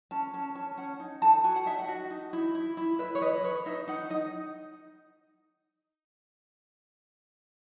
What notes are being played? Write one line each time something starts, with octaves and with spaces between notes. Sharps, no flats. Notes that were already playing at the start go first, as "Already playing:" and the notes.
C#4 A5
C#4 A5
C#4 A5
C#4 F#5
D#4
A4 A5
F#4 G#5
F#5
D#4 E5
F#5
F#4
D#4
E4
E4
E4
B4 E5
C#5
B4 D#5
B4 C#5
D#4 E5
D#4 F#5
D#4 D#5